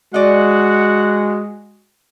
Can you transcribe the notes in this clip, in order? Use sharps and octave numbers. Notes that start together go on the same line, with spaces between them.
G#3 F#4 D5 D#5 F#5